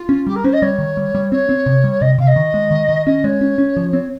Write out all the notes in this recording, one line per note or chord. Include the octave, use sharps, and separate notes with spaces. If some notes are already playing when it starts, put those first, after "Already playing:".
Already playing: F4
C#4
G3 G4
A#4
C#4 C5
D#5
G3 C#5
D#3
G3
G3
C4 C#5
C4
C3
G3
C3 D#5
C3 F5
D#5
D#3
G#3
D#3
D#3
C#4 D#5
G#3 C#5
C#4
C#4
F3
C4